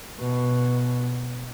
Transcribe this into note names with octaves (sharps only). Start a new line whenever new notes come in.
B2